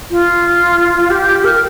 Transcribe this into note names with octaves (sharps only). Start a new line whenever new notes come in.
F4
G4
A#4